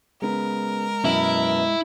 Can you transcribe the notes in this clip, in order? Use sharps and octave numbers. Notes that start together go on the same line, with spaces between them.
C#3 G#3 B3 A#4
F#2 B2 B3 E4